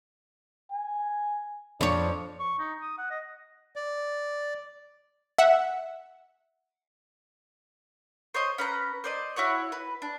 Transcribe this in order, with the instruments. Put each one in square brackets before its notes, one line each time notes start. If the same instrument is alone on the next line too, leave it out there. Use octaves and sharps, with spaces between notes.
[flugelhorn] G#5
[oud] F2 C#5 [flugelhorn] D4
[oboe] C#6
D#4
D#6
F#5
D#5
[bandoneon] D5
[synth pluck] E5 F#5
[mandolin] C5 C#5 D#5
C#4 B4 A#5
C5 D5 D#5
E4 F#4 C#5 F#5
B4
D4